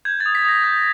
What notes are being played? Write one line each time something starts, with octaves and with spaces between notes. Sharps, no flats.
G6 G#6
A6
D#6
B6
D#6 A#6
G6